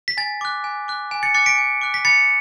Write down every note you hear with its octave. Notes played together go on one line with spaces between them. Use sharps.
B6
G#5 A6
D6 F#6
G#5
D6 F#6
G#5
A6 C#7
D6 F#6 A6 C#7
B6 D7
G#5
D6 F#6
B6
B5 A6 C#7